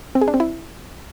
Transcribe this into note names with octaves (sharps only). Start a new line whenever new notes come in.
C4
G#4
D4
C4
E4